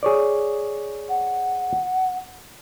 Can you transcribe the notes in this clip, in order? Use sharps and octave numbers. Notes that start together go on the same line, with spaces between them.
G#4 C#5 D5
F#5